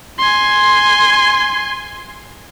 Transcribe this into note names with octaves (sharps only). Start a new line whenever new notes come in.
G#5 C6